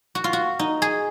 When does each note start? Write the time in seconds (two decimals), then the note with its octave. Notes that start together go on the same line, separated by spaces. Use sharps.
0.15 F#4
0.24 F4
0.33 F#4
0.59 D#4
0.82 G#4